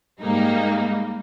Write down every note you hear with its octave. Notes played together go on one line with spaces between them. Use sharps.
G#2 G3 A#3 D#4